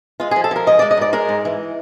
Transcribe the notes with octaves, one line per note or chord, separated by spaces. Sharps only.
G#3 F4
F3 G#4
A4
F3 A#4
G#2 D#5
G#3 D5
D#5
G#2 D5
G#3 A#4
G#2
E3